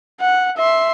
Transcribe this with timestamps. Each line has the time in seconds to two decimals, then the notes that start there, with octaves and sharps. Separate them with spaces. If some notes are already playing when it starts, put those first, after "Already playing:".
0.21 F#5
0.57 E5 C6